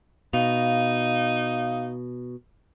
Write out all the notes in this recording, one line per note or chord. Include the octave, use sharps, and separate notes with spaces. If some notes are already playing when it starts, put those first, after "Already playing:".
B2 D#4 F5